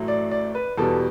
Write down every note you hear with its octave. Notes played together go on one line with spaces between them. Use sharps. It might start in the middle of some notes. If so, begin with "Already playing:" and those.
Already playing: A1 A2 F#3 A3
D5
D5
B4
E2 B2 G3 A4